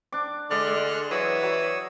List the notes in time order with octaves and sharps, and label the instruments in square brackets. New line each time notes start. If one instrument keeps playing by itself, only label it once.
[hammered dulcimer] D4 D6
[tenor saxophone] D3 [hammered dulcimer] G#3 D5 [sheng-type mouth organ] F6 F#6
[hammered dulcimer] G#3
[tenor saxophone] E3 [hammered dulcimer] F#3 [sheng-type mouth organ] C#5 D#6 E6
[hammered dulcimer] F#3